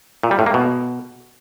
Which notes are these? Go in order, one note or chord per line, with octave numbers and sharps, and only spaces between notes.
A#2
G3
A2
A#3
B2